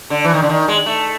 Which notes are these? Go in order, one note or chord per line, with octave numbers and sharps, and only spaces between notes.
D3
E3
D#3
D3
D#3
G#3
A3